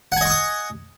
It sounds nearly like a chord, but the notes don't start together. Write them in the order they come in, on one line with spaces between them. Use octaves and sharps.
F#5 G#5 D#5 C#6 D#6